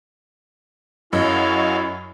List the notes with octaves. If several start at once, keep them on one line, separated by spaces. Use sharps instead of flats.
F#2 E4 F#4 G#4 D#5 F5